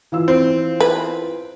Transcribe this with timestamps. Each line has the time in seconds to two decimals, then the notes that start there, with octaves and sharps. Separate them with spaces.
0.12 E3 F4 E6
0.28 C4
0.80 B4